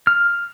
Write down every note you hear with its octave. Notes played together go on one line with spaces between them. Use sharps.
F6